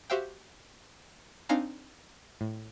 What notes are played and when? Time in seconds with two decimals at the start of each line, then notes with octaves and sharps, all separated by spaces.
0.10 F#4 G4 C5 E5 F5 G5
1.49 C4 D4 D#4 F5 G#5 A#5
2.41 A2